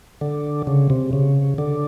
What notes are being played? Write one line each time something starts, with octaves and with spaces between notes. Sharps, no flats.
D3
C#3
C3
C#3
D3